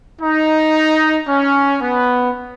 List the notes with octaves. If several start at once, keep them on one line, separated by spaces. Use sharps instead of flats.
D#4
C#4
B3